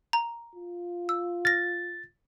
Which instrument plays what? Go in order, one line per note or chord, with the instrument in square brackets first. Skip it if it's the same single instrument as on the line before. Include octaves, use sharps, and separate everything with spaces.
[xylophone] A#5
[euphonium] F4
[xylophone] E6
[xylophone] F6 A#6 [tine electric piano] A6